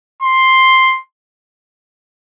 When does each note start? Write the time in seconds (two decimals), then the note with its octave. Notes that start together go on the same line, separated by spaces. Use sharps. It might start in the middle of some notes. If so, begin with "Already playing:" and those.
0.22 C6